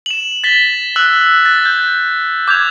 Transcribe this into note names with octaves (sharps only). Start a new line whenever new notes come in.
E7 F#7
A6 B6 G7
E6 F#6 F#7
F#6 A6
G6
D6 G6 G#6 F7